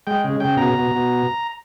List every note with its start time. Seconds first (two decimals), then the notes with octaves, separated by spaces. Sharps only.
0.07 G#3 G5
0.24 C#3
0.40 C#3 G5
0.57 B2 A#5
0.74 B2
0.91 B2